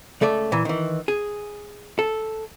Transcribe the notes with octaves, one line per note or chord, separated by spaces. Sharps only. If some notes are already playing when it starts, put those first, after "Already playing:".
C#2 A3 A4 D5
A#2 E3
D#3 E3
G#4
A4